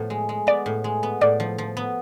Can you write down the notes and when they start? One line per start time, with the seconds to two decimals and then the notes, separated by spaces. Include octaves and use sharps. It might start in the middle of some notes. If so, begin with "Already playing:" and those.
Already playing: A2 F3 B3
0.10 G#3
0.29 G#3
0.47 B3 D5
0.66 A2
0.84 G#3
1.03 B3
1.21 A2 D5
1.40 F3
1.58 F3
1.77 B3